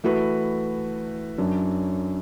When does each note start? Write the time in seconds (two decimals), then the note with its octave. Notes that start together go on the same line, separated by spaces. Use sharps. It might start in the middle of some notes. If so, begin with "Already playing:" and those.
0.04 E3 A3 F#4 B4
1.38 F#2 F#3 D4